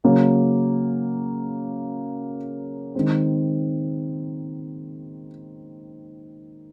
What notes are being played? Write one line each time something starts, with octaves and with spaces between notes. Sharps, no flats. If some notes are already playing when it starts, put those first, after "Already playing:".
C#3 F#3 A#3 C#4
D#3 G#3 C4